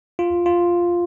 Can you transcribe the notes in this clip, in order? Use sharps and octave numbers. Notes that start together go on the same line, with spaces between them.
F4
F4